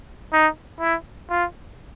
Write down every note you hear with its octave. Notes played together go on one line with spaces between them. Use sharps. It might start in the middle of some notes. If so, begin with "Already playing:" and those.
D#4
E4
F4